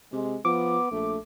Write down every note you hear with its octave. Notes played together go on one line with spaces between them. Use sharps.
C3 G#3
F3 B3 D6
A#1 A3